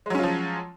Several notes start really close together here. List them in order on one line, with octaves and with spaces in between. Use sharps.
G#3 F#3 C#4 F4 F3